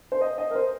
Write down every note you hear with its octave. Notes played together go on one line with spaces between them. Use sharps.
C5
D#5
D#5
A#4
C5